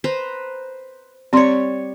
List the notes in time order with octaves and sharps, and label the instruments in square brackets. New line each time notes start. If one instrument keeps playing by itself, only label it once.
[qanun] B4 C5 A#5
[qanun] G3 C#5 [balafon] C4 C6